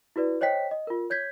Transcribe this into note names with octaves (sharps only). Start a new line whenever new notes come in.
E4 F#4 B4 D5
C5 C#5 D#5 G5 B6
D#5
F4 A#4
C#5 G6 G#6 B6